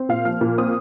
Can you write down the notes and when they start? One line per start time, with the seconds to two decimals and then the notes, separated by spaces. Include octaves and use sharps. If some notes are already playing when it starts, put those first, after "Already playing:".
Already playing: C4
0.09 A#2 F5
0.25 F3 F6
0.41 A#2
0.58 C4 D#6